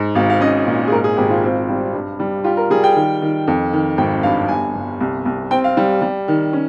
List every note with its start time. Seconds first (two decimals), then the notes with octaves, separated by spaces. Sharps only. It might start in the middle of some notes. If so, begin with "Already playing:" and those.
Already playing: G#2
0.15 G#1 F5
0.30 F5
0.41 C#4 D#5
0.66 A#2
0.88 G#4
0.92 G#2 A#4
1.04 G#4
1.17 G#1 G4
1.30 F4
1.44 C4
1.69 G3
1.94 G2
2.19 G3
2.44 F4 G4
2.57 A#4
2.70 G3 G#4
2.84 G5
2.95 D#3
3.22 D#3
3.47 F2
3.73 D#3
3.98 G#1 G5
4.23 G2 F5
4.48 G1 G#5
4.75 G1
5.01 C2
5.26 C2
5.51 C4 G5
5.64 F5
5.77 G3
6.01 G3
6.28 D#3
6.53 C#4